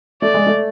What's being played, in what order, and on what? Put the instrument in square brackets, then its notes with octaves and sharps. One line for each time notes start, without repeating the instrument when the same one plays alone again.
[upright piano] A3 [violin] D5
[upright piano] G#3
A3